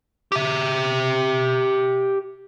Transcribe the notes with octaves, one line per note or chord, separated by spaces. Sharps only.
G4 E5